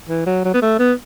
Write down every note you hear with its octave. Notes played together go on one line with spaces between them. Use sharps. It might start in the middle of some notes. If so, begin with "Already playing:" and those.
E3
F#3
F#3
B3
A3
B3